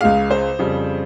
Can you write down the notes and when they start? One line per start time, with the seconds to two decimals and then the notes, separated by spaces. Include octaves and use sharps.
0.01 C#2 C#3 G#3 F5
0.30 C5
0.59 F2 C#3 G3